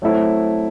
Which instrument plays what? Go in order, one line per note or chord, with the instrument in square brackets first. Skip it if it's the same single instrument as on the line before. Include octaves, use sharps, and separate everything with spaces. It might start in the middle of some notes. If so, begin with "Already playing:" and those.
[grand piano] F#3 A3 C4 E4